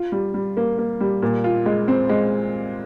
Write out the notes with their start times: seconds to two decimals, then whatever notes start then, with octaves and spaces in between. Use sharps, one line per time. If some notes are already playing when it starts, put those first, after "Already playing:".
Already playing: F4
0.12 G3
0.34 G3
0.57 A#3
0.78 A#3
1.00 G3
1.22 A#2
1.44 F4
1.66 G#3
1.88 C4
2.09 G#3